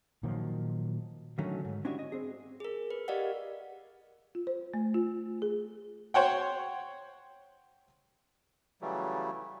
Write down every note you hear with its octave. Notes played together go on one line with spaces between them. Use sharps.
A#2 D#3 F3 F#3
D3 D#3 F#3 A3 C#4
G#2
C#4 D4 E4 F#4 G4 D#5
D#5
C4 G#4
G#4 A#4
B4
G4 A#4 D5 D#5 F5 F#5
F4
C5
A3
F4
G#4
C5 C#5 F#5 G5
C#3 E3 F#3 G3 A3